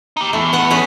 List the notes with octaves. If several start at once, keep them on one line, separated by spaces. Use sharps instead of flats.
D#4 G4
E2 A3
B3 F#5
C#4 G#4 B4